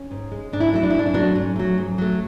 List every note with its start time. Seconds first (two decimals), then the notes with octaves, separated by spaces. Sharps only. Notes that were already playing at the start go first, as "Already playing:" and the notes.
Already playing: C#4
0.11 G#2
0.32 G#3
0.53 G#2 D4
0.61 E4
0.69 D4
0.73 F#3 A3 E4
0.83 D4
0.90 E4
0.94 G#2 D4
1.06 E4
1.14 F#3 A3 B3 D4
1.35 G#2 C#4
1.56 F#3 A3
1.78 G#2
1.98 F#3 A3